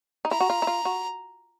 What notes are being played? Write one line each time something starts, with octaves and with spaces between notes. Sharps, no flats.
D#4
E4 A#5
F#4
F4
E4
F4
F#4